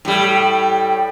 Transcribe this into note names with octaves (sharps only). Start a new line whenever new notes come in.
A2 G3